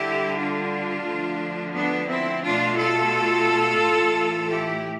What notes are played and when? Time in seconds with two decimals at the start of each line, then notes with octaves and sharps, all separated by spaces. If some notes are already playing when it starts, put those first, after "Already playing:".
Already playing: D3 G3 E4 G4
0.38 D4 F4
1.06 D3 F3 A3
1.75 B3 D4
2.10 C4 E4
2.44 B2 A3 D4 F4
2.78 F4 A4
3.82 A2 E3 A3
4.50 E4 G4